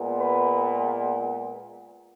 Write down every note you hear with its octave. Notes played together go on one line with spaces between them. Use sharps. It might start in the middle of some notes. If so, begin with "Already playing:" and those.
Already playing: A#2 G#3 B3
B4